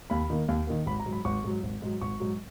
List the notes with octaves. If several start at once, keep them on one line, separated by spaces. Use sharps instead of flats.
D#2 B5
D#3 A#3
D#2
D#3 A#3
G#1 B5
A#5
G#2 F#3
B5
G#1 C#6
G#2 F#3
G#1
G#2 F#3
G#1 C#6
G#2 F#3